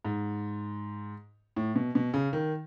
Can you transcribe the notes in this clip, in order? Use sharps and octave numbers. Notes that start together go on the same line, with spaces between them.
G#2
A2
B2
B2
C#3
D#3